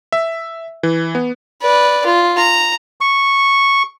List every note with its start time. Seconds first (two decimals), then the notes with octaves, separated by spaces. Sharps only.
0.12 E5
0.83 E3
1.15 B3
1.62 B4 D5
2.06 F4
2.37 A#5
3.01 C#6